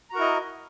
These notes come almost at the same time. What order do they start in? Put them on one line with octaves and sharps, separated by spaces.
A#5 F#4 A#4 E4 D#5